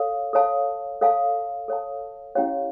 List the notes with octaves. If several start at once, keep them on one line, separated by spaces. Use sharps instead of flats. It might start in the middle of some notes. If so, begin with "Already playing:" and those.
Already playing: A4 C#5 F5
A4 C#5 F5 A5
A4 C#5 F5 A5
A4 C#5 F5 A5
C#4 E4 G4 C#5 F5